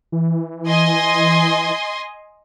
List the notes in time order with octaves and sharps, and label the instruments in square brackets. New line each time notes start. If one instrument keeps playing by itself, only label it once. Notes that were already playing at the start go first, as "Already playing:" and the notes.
[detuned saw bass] E3
[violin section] D#5 G#5 C6